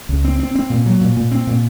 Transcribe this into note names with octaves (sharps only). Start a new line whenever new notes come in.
C#2
C4
C4
C4
A#2
F#3
A#2
A#2
C4
A#2